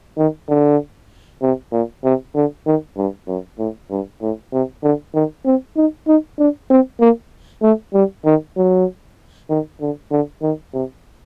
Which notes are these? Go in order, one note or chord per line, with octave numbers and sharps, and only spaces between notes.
D#3
D3
C3
A#2
C3
D3
D#3
G2
F#2
A2
G2
A2
C3
D3
D#3
C4
D#4
D#4
D4
C4
A#3
A3
G3
D#3
F#3
D#3
D3
D3
D#3
C3